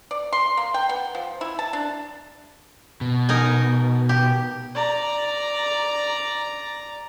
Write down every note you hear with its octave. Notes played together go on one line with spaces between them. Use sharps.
D5
C6
A#3
G5
B3
F3
E4
A5
D4
B2
D#4 A#4 G#5
G4
D5 A#5